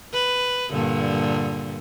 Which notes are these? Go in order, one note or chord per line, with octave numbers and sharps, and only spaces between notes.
B4
G2 A#2 D3